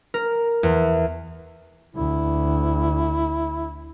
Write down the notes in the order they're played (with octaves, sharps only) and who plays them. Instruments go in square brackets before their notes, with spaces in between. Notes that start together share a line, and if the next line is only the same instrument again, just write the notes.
[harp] A#4
E2
[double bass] D2 [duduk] E4